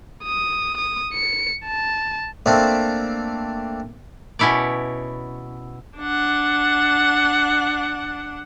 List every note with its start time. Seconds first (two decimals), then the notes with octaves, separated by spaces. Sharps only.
0.23 D#6
0.77 D#6
1.13 C#7
1.65 A5
2.46 A3 A#3 C4 D4 E5
4.39 B2 C#4 E4 C#5 D5
5.99 D4 F#5